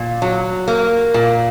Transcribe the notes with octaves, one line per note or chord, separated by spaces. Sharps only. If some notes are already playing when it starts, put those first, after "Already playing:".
Already playing: A#2
F#3
A#3
A#2